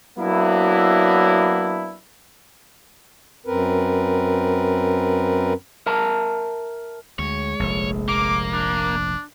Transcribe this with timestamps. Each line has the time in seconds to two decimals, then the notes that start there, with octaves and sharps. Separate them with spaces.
0.18 F#3 A#3 B3 D4 E4
3.46 F#2 C4 A#4 B4
5.86 A#4 E5 A5 A#5
7.19 D2 G#3 C#5
7.60 F1 A#1
8.08 A#3 D6
8.53 D4